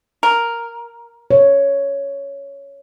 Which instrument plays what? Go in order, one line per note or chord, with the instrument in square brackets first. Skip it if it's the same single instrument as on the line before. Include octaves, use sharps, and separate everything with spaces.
[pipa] A#4
[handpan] C#5